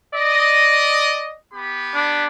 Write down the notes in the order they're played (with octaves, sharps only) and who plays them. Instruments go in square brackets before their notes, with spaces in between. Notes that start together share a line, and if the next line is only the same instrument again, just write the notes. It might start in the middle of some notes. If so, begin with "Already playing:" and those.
[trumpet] D5 [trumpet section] D#5
[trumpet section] B3 G4 B5
[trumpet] D4